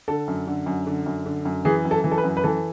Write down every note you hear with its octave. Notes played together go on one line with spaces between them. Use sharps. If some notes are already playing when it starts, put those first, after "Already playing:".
D3 A4
F#2
D3
F#2
D3
F#2
D3
F#2
E3 G#4
F#2
A4
E3
A4
B4
F#2
B4
E3 A4